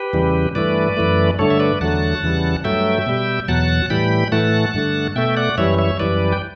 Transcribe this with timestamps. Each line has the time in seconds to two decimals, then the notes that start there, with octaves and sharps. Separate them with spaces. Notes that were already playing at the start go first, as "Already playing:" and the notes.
Already playing: G4 B4
0.13 E2 C#3 E3 G3
0.55 G2 E3 A3 B4 D5
0.97 F#2 E3 A3
1.39 G2 D3 A3 A4 C#5
1.50 E5
1.60 B4 D5
1.81 E2 D3 F#3 A3 F#5 A5
2.22 E2 C#3 E3 G3
2.64 G2 F#3 A3 E5 G5
3.06 B2 G3
3.48 E2 B2 F#3 F#5 A5
3.90 A2 E3 G3 G5 B5
4.32 A2 E3 A3 F#5 A5
4.74 G2 D3 A3
5.16 B2 A3 E5 G5
5.37 D5 F#5
5.58 F#2 E3 G3 C#5 E5
5.79 C#5 E5
6.00 F#2 E3 G3 B4 D5
6.32 G5